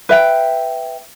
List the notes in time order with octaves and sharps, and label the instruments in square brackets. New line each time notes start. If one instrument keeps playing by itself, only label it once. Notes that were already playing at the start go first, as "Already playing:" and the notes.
[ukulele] B4 E5 G5